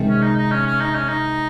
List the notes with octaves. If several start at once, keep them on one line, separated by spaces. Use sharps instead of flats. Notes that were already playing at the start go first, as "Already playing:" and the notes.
Already playing: C3 D#3 G#3
C#4
D#4
D#4
C#4
C#4
D#4
C#4
D#4